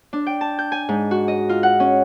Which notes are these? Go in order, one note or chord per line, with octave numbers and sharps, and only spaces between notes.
D4
G5
A5
G6
G#5
G#2
F#4
D#5
F4
F#5
C#4